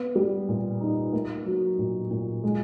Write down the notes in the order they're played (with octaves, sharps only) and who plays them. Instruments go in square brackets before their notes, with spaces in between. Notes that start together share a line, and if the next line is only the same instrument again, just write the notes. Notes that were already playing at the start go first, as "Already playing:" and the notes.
Already playing: [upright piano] B3
G3
A#2
D#4
A#3
F#3
A#2
A#2
G#3